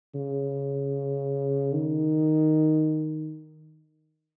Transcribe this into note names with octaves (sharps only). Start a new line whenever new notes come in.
C#3
D#3